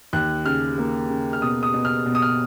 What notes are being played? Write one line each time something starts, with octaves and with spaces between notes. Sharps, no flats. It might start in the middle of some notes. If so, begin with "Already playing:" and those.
D#2 F#6
C#3 F6
A#3
C#3
F6
B2 D#6
D#6
B2
F6
B2
D#6
F6